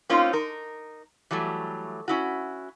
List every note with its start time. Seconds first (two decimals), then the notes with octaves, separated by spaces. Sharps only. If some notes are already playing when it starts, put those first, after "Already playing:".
0.09 A#3 C4 C#4 D#4 F4
0.33 D#4 A#4
1.31 E3 F#3 G3 A3
2.08 C#4 E4 F#4